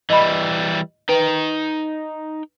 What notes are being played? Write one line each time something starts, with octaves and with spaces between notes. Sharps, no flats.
E3 G3 D#5 B5
D#4 B4 G5